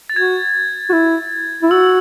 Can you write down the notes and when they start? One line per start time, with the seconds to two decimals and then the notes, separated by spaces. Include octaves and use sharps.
0.10 A6
0.16 F#4 G#6
0.89 F#4
0.93 E4
1.63 E4
1.71 F#4 E6